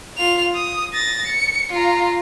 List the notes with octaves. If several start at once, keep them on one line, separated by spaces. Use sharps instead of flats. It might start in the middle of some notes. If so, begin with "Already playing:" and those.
F4 F7
D#6
A6 A#6
C#7
F4 A#5